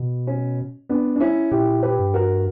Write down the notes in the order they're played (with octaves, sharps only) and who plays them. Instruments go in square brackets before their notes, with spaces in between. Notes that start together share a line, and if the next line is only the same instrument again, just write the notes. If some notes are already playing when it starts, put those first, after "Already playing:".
Already playing: [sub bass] B2
[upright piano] C#4
B3 D4
D4
C#4 E4
[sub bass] A#2 [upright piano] E4 G4
[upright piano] G4 B4
[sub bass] G2
[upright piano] F#4 A#4